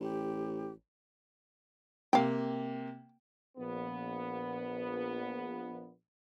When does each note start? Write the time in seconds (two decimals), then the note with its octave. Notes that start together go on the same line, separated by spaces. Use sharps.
0.01 A1 G4
2.13 C3 A#3 F5 G5
3.58 A#1 B3